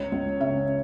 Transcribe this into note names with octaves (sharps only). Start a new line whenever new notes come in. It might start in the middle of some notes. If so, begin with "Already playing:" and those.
Already playing: C#2 C#5
C#2
C#3 E5